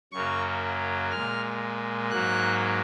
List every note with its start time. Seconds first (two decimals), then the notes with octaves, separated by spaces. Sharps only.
0.12 F#2 C#3 F#3 A#3 C#6
1.11 G#3 F6
1.16 A#2
2.11 G#2 F#3 A#3 F#6